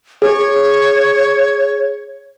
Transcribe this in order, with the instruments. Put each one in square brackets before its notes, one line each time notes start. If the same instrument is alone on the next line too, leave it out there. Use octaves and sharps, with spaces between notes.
[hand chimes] G#4 [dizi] C#5